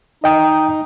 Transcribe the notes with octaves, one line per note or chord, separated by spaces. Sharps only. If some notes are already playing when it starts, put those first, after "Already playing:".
D#4 D#5 G5 D#6